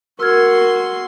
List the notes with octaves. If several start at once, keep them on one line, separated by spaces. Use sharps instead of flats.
F#4 A#4 C6 E6 F6 G#6